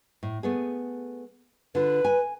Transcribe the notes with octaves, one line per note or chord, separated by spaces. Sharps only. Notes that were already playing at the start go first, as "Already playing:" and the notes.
A2
A3 B3 G#4
D3 F4 B4
G#5